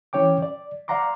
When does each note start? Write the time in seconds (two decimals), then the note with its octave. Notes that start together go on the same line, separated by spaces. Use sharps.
0.13 E3 C#4 C#5 G5 D6
0.42 D5
0.88 D5 F5 F#5 A#5 C6 D6